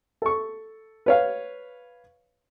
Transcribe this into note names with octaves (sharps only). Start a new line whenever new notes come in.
A4 C#6
B4 C#5 F5